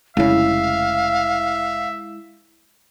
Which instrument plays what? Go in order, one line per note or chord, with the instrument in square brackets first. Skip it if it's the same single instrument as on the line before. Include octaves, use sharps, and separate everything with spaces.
[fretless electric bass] F1 C#3 [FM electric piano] G#3 E4 [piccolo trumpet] E5 [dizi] F5